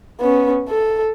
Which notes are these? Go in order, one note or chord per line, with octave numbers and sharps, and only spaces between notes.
B3 C#4
A4